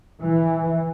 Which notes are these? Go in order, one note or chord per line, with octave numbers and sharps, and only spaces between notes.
E3